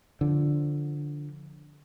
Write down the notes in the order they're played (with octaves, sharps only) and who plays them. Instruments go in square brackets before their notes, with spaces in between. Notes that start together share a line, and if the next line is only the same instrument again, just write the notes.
[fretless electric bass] D3 F3